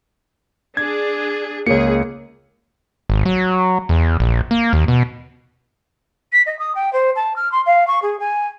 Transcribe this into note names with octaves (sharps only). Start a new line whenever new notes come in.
D4 G#4 G#6
C#2 A#3 G#4 C#5 C#7
G#1
F#3
E2
A#1
A#3
D#2
B2
B6
D#5
D#6
G5
C5
A5
F6
C6
F5
C#6
G#4
G#5